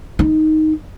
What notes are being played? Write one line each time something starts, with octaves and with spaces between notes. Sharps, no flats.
D#4